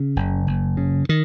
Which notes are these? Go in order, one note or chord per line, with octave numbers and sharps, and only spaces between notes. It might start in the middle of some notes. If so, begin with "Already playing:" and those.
Already playing: C#3
F#1
F#1
C#3
D#3